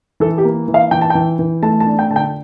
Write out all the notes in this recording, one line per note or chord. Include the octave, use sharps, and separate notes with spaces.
E3 A4
G4
A#3
E3
F5
E3 G5
A5
E3 G5
E3
A3 A5
A5
D4
G5
D3 A5
G5